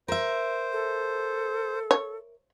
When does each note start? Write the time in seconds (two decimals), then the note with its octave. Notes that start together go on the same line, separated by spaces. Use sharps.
0.08 A#4 C5 E5
0.72 A4
1.91 C#5